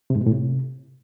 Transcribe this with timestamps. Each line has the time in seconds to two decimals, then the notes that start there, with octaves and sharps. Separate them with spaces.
0.10 C3
0.16 G#2
0.21 B2
0.26 A2
0.32 C3